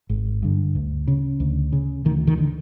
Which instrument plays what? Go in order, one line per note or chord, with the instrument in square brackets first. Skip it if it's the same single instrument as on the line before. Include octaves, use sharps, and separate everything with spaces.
[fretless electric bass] G#1
G2 D3
D2
C#3
D2
C#3
D2 D#3
D#3
D3